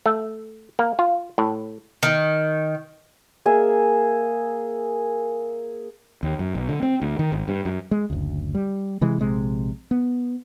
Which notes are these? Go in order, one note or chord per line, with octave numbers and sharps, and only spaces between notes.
A3
A#3
F4
A2
D#3
A#3 G#4 E5
D#2
F#2
B1
D3
C4
D2
D#3
G#1
G2
F#2
G#3
F#1 D2
G3
C3 E3 G#3
A#1 C3 G#3
B3